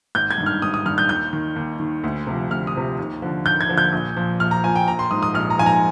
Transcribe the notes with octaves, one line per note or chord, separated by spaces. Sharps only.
G#1 G6
G#6
G2 D#3
F6
G#1 D#6
D#6
G2 D#3 F6
G6
D#2 G6
D#3
D#2
D#3
D2
C3 F3
D2 F6
D#6
C3 F3
D#2
D3 F3
D#2 G6
G#6
D3 F3
G6
A#1
A#2 F3
A#1 F6
A#5
A#2 F3 G#5
G5
A#1 A#5
C6
G#2 F3 D#6
D#6
A#1 F6
A#5
G#2 F3 G#5
A#5